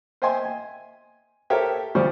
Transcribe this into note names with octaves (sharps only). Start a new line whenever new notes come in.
C5 D#5 E5 G5 G#5 C6
G#5
G4 A4 A#4 C5 C#5 E5
D2 F3 G3 C5 D5 C#6